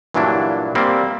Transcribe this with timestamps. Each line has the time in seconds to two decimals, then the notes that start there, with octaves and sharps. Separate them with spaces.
0.14 G2 A#2 E3 F#3 D4 E4
0.75 G3 A#3 C4